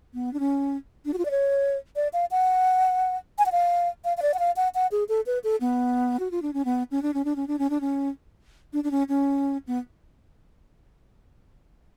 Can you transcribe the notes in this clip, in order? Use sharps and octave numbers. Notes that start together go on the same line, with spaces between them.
B3
D4
C#4
D4
F#4
F4
D5
C#5
D5
F5
F#5
G#5
F#5
F5
F5
F5
D5
F#5
F5
F#5
F#5
G#4
A4
B4
A4
B3
F#4
F4
D4
C#4
B3
C#4
D4
C#4
D4
C#4
D4
C#4
D4
C#4
D4
D4
C#4
C#4
B3